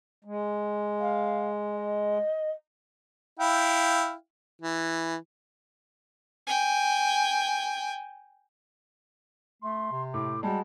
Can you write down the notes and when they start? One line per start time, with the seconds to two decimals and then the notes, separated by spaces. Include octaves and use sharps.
0.24 G#3
1.00 F5
1.73 D#5
3.40 E4 F5 G5
4.62 E3
6.47 G5 G#5
9.62 A3 C6
9.92 C3
10.14 A2 D6
10.43 G3 G#3 F#4 A5